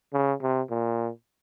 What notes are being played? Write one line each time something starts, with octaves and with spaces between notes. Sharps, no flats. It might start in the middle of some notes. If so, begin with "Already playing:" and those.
C#3
C3
A#2